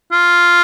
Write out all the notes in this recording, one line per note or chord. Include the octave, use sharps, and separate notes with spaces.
F4